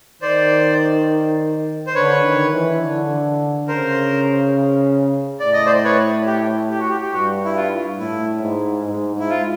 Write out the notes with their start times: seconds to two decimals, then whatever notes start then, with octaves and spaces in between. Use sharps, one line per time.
0.22 D#3 C5 D5
1.87 C5
1.95 D3 B4 C#5
2.24 D#3
2.53 E3
2.81 D3
3.68 C#3 A#4 C5
5.40 A2 D5
5.53 D#5
5.66 C5 D5
5.84 B4 C#5
6.27 G4
6.71 G4
6.79 F#4
6.89 G4
7.02 G4
7.13 G2 F#4
7.45 E4
7.56 F4
7.99 A2 E4
8.42 G#2
8.86 G#2
9.15 G#2 E4
9.29 F4